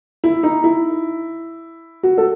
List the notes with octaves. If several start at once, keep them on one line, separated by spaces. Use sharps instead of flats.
E4
D#4
E4
F#4
A4